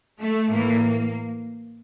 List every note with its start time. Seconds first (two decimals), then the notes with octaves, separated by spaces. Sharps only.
0.19 A3
0.50 A2 E3 A#3